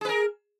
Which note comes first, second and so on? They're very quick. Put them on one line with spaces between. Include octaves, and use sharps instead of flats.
G#4 B4 A#4